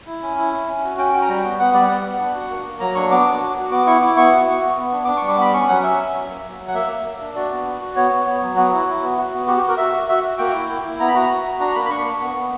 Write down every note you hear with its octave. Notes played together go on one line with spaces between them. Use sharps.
E4
C#4
E4
C#4
C#4
F#4
C#4 G5
F#4 G5
A#5
G3 G5
B3
B3 F#5
G3 D5
B3 F#5
B3
D4
F#4
A#3
A#3
F#3 A#5
D4 C#6
B3 D6
F#4
F#4
F#4
B3 D6
E4 C#6
E4 D6
B3 C#6
F#4
B3
B3
B3
D4
D4 D6
C#6
G3
D6
B3 B5
C#4 C#6
F#3 F#5
C#4 E5
C#4
F#3
A#3
F#3
F#3
F#5
A#3 E5
A#3
A#3
D4
F#4 D5
B3
F#4
F#4
B3 C#5
B3
B3
F#3
B3 F#4
E4
E4
B3
F#4
B3
F#4 G4
G4
F#4
A#4
F#4 E5
F#4
F#4 E5
F#4
A#3 G5
E4
A#3
E4
B3 A#5
B5
F#4 A#5
F#4
F#4
D4 A#5
A#3 B5
B5
D4 C#6
A#3
B3
B3